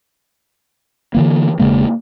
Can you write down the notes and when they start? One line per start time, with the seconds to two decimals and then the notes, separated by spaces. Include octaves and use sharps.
1.15 D3 E3 A#3
1.60 E1 C#3 G#3 A#3